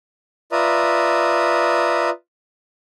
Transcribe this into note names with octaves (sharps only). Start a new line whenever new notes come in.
F4 B4 D5 E5 A#5 D#6